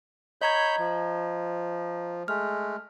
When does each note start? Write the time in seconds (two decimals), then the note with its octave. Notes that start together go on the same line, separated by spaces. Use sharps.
0.42 C#5 D#5 A#5 B5 G6 G#6
0.79 F3
2.28 G#3 A3 F6